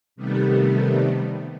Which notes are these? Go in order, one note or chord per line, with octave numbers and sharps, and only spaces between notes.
C3 D#3 G3 A3 B3